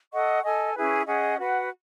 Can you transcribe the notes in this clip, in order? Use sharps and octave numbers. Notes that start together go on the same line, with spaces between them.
A4 D#5 F#5 C#6
A4 D#5 G#5
C#4 E4 G#4 B4
C#4 G#4 D#5 F#5
F#4 B4 F#5